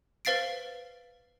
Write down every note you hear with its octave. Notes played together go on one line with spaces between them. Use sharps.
B4 C5 F5 A6 C7 D7